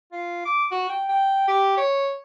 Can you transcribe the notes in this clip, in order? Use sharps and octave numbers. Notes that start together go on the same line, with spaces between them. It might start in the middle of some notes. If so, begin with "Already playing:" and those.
F4
D6
F#4
G5
G5
G4
C#5